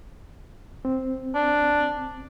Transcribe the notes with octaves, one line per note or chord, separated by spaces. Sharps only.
C4
D4